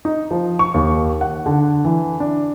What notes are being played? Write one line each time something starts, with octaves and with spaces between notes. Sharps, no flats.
D#4
F3
C#6
D#2
F#5
D3
E3
D4